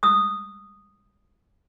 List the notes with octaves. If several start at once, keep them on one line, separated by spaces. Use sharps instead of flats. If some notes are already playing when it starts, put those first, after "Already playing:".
D#6 E6